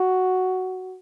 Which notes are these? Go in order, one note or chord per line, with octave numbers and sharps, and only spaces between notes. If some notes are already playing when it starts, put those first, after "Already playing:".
Already playing: F#4